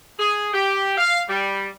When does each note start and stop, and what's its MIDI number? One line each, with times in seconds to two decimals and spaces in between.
0.19 0.52 68
0.53 0.94 67
0.97 1.22 77
1.29 1.68 55